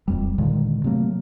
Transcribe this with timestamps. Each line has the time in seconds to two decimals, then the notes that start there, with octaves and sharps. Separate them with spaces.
0.08 D1 F2 G3
0.38 A#2 D3 D#3 G#3
0.84 C3 F#3 A3 A#3